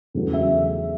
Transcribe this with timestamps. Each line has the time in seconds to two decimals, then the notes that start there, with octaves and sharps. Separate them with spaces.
0.14 E2 C#3 F#3 A3
0.33 E5